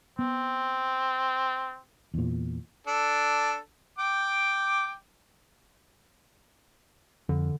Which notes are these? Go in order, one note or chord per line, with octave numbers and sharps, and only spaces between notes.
B3 C4
E2 A#2
D4 A4
G5 D6
F2 D3